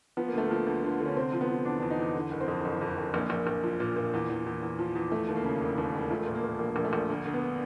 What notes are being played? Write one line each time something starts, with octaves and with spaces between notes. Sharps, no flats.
F3 B3
A#3
D2 A3
F3 A#3
D2
D3
D3 C#4
C3 C4
F3
B3
F3
E2 D4
E2 D4
D#4
E2
D3
F#1
C4
F2
F#1
F2
F#1
A#1 A#3
A#1
A#1
F3
A#2
A#2
E2
E2
E2
E2
F3
E2
F3 A3
D#2
A#3
C#3
E1
D#2
E1
F3 A3
A#2
A#3
A#2
A#1 A#3
A#1
A3
A#1
D2 A#3
D2
B3